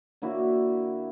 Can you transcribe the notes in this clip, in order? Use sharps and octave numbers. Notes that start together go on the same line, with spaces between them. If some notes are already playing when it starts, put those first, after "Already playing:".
D3 A#3 E4 F#4